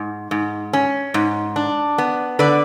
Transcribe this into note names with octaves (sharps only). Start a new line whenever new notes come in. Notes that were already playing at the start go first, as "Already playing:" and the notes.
Already playing: G#2
G#2
C#4
G#2
D4
B3
D3 B4 D5